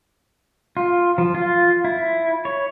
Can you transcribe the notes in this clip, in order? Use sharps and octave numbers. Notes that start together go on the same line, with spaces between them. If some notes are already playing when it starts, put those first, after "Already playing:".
F4
F3
F4
E4
C#5